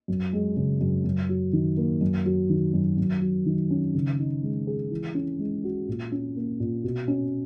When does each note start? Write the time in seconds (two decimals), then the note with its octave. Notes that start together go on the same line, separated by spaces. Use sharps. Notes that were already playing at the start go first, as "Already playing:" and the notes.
0.08 F#2
0.33 G#3
0.56 C#3
0.81 F#2
1.05 F#2
1.29 F#3
1.53 D#3
1.77 A#3
2.01 F#2
2.26 F#3
2.50 D#3
2.73 F#2
2.98 F#2
3.22 F#3
3.46 D#3
3.71 C#4
3.94 C#3
4.19 D#4
4.43 G#3
4.67 G#4
4.91 E3
5.15 C#4
5.39 G#3
5.64 F#4
5.88 A#2
6.12 C#4
6.36 A#3
6.60 A#2
6.84 B2
7.08 C#4